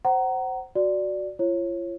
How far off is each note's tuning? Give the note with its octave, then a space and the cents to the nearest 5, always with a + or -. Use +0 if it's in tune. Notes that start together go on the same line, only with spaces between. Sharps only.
C5 +0 F#5 +30 A#5 +0
F#4 +0 D5 +0
F4 -40 C#5 -25